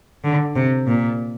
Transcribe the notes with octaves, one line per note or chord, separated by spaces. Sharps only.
D3
C3
A#2